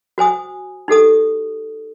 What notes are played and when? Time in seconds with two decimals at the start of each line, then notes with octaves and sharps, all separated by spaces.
0.18 F#4 C5 G#5 D#6
0.88 D#4 G4 A4 D#6